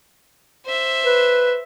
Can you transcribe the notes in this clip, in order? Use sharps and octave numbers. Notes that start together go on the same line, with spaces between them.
C5 E5
B4